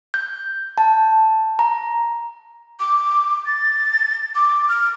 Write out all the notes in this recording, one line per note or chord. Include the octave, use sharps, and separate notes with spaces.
G6
A5
A#5
D6
A6
D6
F6